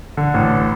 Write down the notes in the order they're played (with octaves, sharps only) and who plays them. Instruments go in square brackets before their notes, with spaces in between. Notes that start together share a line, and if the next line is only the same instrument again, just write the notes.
[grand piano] D3
A1